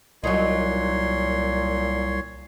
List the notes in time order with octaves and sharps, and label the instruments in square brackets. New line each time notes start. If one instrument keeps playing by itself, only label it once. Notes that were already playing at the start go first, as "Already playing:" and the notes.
[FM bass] C2 [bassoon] A#2 [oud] F#3 D#4 [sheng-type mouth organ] C#5 C6